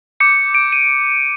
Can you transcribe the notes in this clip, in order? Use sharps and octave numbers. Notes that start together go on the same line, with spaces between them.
D6 G6 C#7
D7
D#7